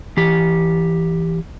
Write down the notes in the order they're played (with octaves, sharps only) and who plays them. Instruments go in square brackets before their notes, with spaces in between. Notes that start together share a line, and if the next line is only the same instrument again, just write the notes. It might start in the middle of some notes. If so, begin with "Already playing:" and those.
[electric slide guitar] E3 G4